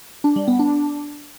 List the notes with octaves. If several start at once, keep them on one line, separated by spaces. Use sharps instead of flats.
D4
G3
B3
D4